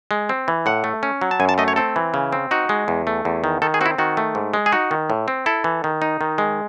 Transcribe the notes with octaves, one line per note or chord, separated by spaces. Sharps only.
G#3
C4
E3
A2 F#5
A3
C#4
F#3
A5
F#2 G#5
A5
A3 D#5
C#5
C4 A4
E3
C#3
C4
D#4 F#4
G#3
E2
A3
E2
D#3
D#3 A4
G#4
C4 E4 F#4
D#3 F#4
A3
G#2
G#3
G#4
D#4 F#4
D#3
A2
C4
E4 A4
E3
D#3
D#4
D#3
G#3